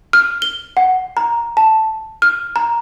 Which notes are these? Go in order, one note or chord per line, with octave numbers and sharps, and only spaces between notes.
F6
G7
F#5
A#5
A5
F6
A#5